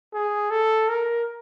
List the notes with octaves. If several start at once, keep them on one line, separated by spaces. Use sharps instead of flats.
G#4
A4
A#4